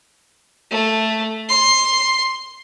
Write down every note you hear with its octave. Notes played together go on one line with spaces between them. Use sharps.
A3
C6